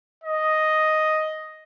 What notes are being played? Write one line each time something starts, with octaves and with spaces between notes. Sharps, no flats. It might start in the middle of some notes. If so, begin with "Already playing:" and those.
D#5